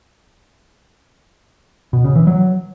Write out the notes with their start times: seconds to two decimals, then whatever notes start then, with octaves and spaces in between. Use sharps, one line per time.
1.93 B2
2.04 C#3
2.16 E3
2.27 F#3